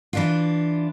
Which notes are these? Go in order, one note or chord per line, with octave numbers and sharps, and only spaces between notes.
E3 D4 F4